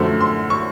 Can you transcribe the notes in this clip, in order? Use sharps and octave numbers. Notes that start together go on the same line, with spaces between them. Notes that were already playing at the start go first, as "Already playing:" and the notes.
Already playing: F#2 D3 F3 A3
C6
C#6